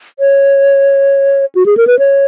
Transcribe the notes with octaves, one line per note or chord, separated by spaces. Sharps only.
C#5
F#4
G#4
A#4
B4
C#5